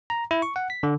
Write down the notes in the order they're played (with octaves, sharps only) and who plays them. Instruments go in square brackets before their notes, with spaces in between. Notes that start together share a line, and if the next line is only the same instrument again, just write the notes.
[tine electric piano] A#5
E4
C#6
F#5
B6
D3